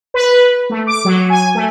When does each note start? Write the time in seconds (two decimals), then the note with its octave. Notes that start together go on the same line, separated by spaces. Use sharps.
0.14 B4
0.70 A3
0.87 D6
1.05 F#3
1.30 G#5
1.55 A3